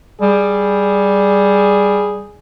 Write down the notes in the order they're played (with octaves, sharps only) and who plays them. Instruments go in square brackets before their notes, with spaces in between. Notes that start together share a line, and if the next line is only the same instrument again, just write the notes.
[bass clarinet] G3 [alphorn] G#4